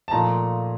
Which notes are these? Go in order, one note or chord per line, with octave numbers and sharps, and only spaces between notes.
A5
A#2 F3 A3 D#4 A#5